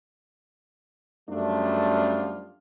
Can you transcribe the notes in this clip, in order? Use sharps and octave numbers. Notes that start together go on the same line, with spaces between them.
F#2 F3 G3 A3 D4 F4